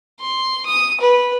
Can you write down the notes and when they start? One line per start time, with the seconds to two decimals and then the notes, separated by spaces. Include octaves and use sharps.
0.20 C6
0.66 D#6
1.01 B4